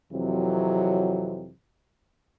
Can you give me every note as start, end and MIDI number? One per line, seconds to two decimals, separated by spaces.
0.12 1.52 41
0.12 1.52 48
0.12 1.52 52
0.12 1.52 54